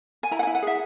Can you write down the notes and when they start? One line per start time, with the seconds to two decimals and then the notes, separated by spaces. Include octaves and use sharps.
0.23 G#5
0.31 E4 A#5
0.39 F#5
0.43 E4 G#5
0.55 F#5
0.62 G#4 E5